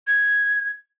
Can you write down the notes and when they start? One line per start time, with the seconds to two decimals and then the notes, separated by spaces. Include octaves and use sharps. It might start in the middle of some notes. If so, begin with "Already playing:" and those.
0.07 G#6